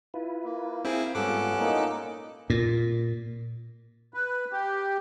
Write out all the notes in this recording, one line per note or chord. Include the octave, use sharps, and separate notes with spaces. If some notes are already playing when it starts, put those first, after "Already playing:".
E4 F4 B4
A#3
C4 E4 G#4 F5 G5
G#2 G3 B3 C#4 F4 A4 D6 F#6
A#2 A#3 D#4 E4 C5
A#2
B4
G4